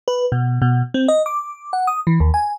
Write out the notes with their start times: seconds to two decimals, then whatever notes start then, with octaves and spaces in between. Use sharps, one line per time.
0.08 B4
0.32 B2
0.62 B2
0.94 C4
1.08 D#5
1.26 D6
1.73 F#5
1.87 D#6
2.07 E3
2.20 D#2
2.34 G#5